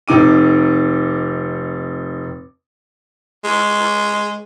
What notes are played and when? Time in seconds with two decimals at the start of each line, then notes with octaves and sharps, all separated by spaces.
0.08 F1 D#4 D6 D#7
3.44 G#3